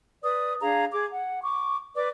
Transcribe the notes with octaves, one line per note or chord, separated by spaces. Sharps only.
B4 D5 D#6
D4 G#4 F5 A#5
G#4 D6
F#5
C#6 D6
B4 D5 D6